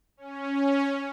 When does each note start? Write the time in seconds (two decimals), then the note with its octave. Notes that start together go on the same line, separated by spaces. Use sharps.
0.17 C#4